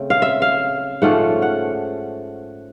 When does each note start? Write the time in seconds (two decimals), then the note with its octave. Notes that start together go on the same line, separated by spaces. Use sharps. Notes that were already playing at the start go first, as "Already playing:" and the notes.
Already playing: C#3 A3 C4
0.10 F5
0.22 E5
0.42 F5
1.02 G#2 F3 A3 C#4 F#5
1.42 F#5